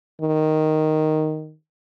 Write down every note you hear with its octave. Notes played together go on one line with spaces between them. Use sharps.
D#3